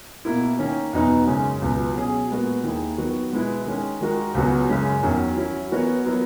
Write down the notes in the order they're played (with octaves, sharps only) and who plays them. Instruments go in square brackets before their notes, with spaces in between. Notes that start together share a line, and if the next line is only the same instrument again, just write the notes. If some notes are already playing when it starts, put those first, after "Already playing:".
[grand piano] B2 A#3 E4
D#3 A#3 C#4
E2 B2 F#3 B3 D#4
F#2 C#3 G#3 C#4 G#4
C#2 B2 F#3 B3
B2 F#3 C#4 G#4
A#2 G#3 B3 F#4 A#4
D#2 D#3 A#3 E4 G#4
D#3 F#3 B3 F#4
B2 G#3 B3 E4
D#3 G#3 C#4
D#3 G#3 D#4 F#4 A#4
C#2 C#3 F#3 B3 F#4
F#2 C#3 G#3 C#4
E2 D#3 F#3 C#4
F#3 C#4 E4
E3 B3 F#4 A#4 C#5
F#3 B3 E4 A#4 C#5